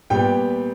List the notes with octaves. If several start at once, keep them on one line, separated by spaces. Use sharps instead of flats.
A#2 G3 B3 G5